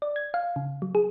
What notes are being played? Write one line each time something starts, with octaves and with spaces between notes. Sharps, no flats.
D5
G#6
F5
C#3
F#3
G#4